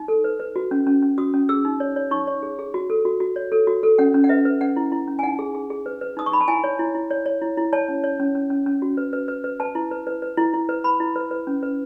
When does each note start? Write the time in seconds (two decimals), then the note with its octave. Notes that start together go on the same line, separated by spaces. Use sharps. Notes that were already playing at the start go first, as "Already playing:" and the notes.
Already playing: D#4
0.08 A4
0.24 B4
0.40 B4
0.56 F#4
0.71 C#4
0.87 C#4
1.02 C#4
1.18 F#4 D#6
1.34 C#4
1.49 G#4 E6
1.65 D#4
1.80 C#5
1.96 C#5
2.11 D#4 C#6
2.27 C#5
2.43 G#4
2.59 G#4
2.74 F#4
2.90 A4
3.05 F#4
3.20 F#4
3.36 C#5
3.52 A4
3.67 F#4
3.83 A4
3.98 C#4 F#5
4.14 C#4
4.24 F#5
4.29 B4 E5
4.45 B4
4.61 C#4 F#5
4.76 E4
4.92 E4
5.08 C#4
5.19 G#5
5.23 D#4 F#5
5.39 G#4
5.55 G#4
5.70 G#4
5.86 B4
6.01 B4
6.17 D#4 D#6
6.26 C#6
6.32 D#4 B5
6.41 A5
6.48 E4 G#5
6.64 C#5
6.79 E4
6.95 E4
7.11 C#5
7.26 C#5
7.42 E4
7.57 E4
7.73 C#5 A5
7.88 C#4
8.04 C#5
8.20 C#4
8.35 C#4
8.50 C#4
8.66 C#4
8.82 F#4
8.97 B4
9.13 B4
9.28 B4
9.44 B4
9.60 B4 A5
9.75 E4
9.91 B4
10.07 B4
10.22 B4
10.38 E4
10.54 E4
10.69 B4
10.84 B4 B5
11.00 E4
11.16 B4
11.31 B4
11.47 C#4
11.63 B4